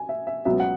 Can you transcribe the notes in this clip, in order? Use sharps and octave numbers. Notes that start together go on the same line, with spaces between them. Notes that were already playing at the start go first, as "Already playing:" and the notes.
Already playing: G#5
E5
E5
C#2 B2 F#3 B3 E5
F#5